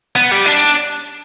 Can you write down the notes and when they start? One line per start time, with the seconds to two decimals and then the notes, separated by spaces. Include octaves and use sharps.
0.16 B3
0.31 G3
0.46 D4